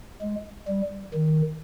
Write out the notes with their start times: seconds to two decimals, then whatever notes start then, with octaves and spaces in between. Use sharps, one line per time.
0.21 G#3
0.68 G3
1.14 D#3